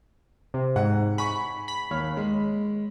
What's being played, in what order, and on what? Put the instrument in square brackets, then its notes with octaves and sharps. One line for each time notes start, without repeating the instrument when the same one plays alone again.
[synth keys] C3
[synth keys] G#2 [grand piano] F#5
[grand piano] G#5 C#6 [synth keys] B5
[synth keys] B5
[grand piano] D#2 C#5 F6
G#3